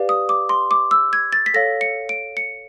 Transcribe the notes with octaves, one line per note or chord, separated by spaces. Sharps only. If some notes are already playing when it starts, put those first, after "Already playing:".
Already playing: G4 B4 D5 F5
D#6
D6
C6
D6
E6
G#6
A6
B6
A4 C#5 F5 A#6
C#7
D7
C#7